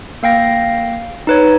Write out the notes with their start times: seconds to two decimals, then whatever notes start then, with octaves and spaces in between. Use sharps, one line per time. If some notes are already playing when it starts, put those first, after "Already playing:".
0.23 A#3 F5 G5 A#6
1.27 D#4 B4 C#5